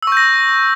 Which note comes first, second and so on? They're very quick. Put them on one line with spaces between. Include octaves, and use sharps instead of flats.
E6 C#6 G6 A#6